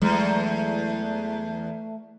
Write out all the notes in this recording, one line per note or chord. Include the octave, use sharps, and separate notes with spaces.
E2 F#3 G#3 A3